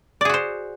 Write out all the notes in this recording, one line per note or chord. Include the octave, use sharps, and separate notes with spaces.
F#4 G#4 C5 D5